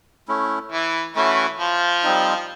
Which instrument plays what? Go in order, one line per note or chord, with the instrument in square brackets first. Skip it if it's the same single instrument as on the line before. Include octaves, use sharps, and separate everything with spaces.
[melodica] A3 C#4 E4
[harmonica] E3 E4
[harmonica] E3 E4 [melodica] A3 C#4 F#4
[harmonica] F3 F4
[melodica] G3 C4 D#4